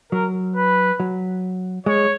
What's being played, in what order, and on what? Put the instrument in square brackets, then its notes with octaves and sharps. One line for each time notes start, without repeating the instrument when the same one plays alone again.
[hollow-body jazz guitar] F#3 [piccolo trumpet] A#4
[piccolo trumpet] B4
[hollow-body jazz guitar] F#3
[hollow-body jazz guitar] G#3 [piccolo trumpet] C#5